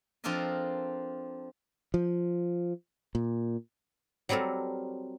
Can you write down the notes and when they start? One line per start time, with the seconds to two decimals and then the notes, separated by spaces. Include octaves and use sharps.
0.24 F3 C4 D4 A4 A#4 D#5
1.94 F3
3.15 A#2
4.29 F#3 G3 C4 A4 A#4